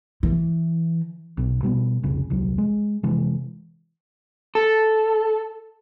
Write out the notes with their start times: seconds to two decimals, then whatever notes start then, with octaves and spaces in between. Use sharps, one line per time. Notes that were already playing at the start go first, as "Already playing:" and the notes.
0.23 E3
1.37 B1 B2
1.63 B2 G3 A#3 B3
2.03 F1 C2 C#3
2.30 D#1 C2 F#3
2.58 G#3
3.03 C3 E3 G#3
4.55 A4